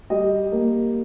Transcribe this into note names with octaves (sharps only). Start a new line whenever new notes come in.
G3 D#5
A#3